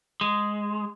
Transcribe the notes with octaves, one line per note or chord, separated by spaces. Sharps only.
G#3